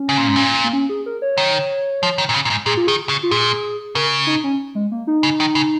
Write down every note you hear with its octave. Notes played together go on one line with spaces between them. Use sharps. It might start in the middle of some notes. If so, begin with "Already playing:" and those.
Already playing: C#4
C#3
A#2
G#2
A#2
A#3
C#4
G#4
A#4
C#5
D#3
F3
D#3
A#2
C#3
A#2
G#2
A#2 G#4
F4
D#3 G#4
C#3
F4
A#2 G#4
C#3 A#4
D#4
C#4
G#3
A#3
D#4
C#3
D#3
C#3